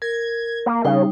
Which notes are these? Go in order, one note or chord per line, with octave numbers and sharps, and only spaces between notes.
A#4 G#6
A#3
C#3 G3 D#4